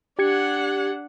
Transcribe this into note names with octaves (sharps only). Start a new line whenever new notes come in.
D4 G4 F#5 G#6 C#7